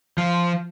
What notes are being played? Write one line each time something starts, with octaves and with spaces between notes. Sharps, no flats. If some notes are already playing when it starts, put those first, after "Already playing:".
F3